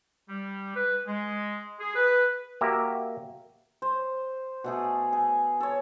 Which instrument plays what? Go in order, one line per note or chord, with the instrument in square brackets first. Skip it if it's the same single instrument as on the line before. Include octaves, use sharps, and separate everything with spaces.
[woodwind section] G3
B4
G#3
G#4
B4
[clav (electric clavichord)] A#3 F#4 G4 E5 A#5
[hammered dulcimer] C5
B2 A3 G#4
G#4 G#5
A4 C#5